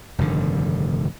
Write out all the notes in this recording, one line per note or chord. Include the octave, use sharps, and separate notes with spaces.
F1 G2 D3 D#3